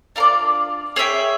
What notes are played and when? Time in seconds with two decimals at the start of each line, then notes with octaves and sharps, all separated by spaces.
0.16 D4 F4 A#4 D5
0.96 G#4 C#5 E5 G5